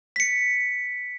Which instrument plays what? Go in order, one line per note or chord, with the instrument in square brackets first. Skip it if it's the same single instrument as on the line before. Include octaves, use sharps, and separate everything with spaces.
[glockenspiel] B6 C#7